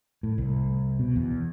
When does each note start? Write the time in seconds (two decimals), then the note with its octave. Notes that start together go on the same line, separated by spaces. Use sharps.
0.23 A2
0.38 C2
0.99 B2
1.16 E2